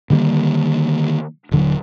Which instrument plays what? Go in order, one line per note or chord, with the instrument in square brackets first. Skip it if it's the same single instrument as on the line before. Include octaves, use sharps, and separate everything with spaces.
[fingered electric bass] D3 D#3 G3 A#3
D#1 D3 F#3